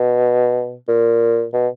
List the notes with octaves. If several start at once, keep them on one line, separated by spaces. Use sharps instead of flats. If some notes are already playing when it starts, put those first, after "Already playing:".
Already playing: B2
A#2
B2